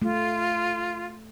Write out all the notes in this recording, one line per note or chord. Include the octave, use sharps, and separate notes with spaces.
A3 F4